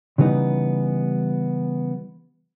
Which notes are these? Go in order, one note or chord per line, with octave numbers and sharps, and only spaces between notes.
C#3 E3 G3 B3 D#4